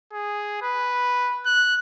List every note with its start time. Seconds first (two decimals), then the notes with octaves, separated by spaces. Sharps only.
0.13 G#4
0.62 B4
1.46 F#6